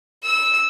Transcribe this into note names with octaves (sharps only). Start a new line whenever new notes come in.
E6